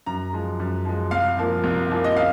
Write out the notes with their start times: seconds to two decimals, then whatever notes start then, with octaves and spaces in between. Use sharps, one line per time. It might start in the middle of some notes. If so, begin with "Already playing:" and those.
0.06 F#2 A#5
0.33 F3 G#3
0.60 F#2
0.85 F3 G#3
1.11 C2 F5
1.37 A#2 F3 A#3
1.64 C2
1.90 A#2 F3 A#3
2.04 D#5
2.16 C#3 F5